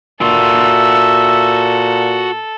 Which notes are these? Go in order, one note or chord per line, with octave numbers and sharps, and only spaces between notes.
A#2 F#4 A4 E5 C6